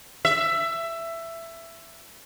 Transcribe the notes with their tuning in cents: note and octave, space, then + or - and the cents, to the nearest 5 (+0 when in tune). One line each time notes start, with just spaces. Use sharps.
E5 +15